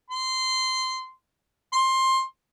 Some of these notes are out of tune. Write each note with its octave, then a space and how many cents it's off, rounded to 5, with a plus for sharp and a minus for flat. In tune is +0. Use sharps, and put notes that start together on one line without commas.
C6 -15
C6 +15